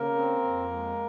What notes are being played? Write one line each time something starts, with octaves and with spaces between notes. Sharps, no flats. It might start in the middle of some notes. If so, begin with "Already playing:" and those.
Already playing: C#3 A#3 A#4
C4
F2
G#3